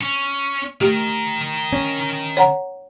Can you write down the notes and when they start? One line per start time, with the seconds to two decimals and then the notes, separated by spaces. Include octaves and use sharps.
0.01 C#4
0.81 D#3 A3 G4 A#4
1.73 C#4
2.37 C#5 F#5 A#5